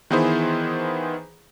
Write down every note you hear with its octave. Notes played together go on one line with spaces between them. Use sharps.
D#3 E3 B3 E4 G#4 C5